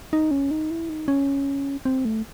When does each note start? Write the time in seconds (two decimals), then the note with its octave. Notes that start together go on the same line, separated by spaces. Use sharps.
0.13 D#4
0.31 C#4
0.51 D#4
0.71 E4
0.89 D#4
1.08 C#4
1.85 C4
2.05 A3